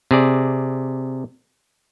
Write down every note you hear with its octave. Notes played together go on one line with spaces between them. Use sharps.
C3 G#4 D5